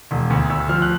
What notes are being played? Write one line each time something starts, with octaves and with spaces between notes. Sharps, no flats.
E1
D2
D2 E6
F3 F6
F#6